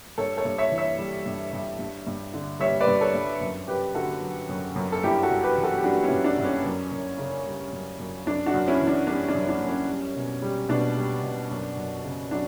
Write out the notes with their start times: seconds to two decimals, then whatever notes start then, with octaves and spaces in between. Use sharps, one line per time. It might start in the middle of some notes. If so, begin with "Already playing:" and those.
0.18 G2 A4 C#5
0.37 A4 C#5
0.45 G2
0.58 C#5 E5
0.72 E3
0.78 C#5 E5
0.98 G3
1.26 G2
1.53 G2
1.79 G2
2.07 G2
2.34 D3
2.60 G3 C#5 E5
2.80 B4 D5
2.87 G2
3.01 A4 C#5
3.14 G2
3.41 F#2
3.68 F#2 G4 B4
3.95 D3 F#4 A4
4.22 F#3
4.49 F#2
4.75 F#2
4.92 A4
5.03 G2 E4 G4
5.23 F#4 A4
5.30 G2
5.43 G4 B4
5.57 E3
5.63 F#4 A4
5.78 G4
5.84 G3 D4 F#4
6.04 C#4 E4
6.10 G2
6.24 D4
6.38 G2
6.45 C#4
6.65 F#2
6.92 F#2
7.18 C#3
7.46 G3
7.72 F#2
7.99 F#2
8.26 F#2 D4
8.46 D4 F#4
8.54 F#2
8.68 C#4 E4
8.81 E3
8.87 D4
9.07 G3 D4
9.28 D4
9.34 F#2
9.49 D4
9.62 F#2
9.69 C#4
9.88 G3
10.16 B2
10.42 G3
10.69 B2 D4
10.97 G3
11.23 B2
11.51 F#2
11.77 F#2
12.04 C#3
12.31 F#3 D4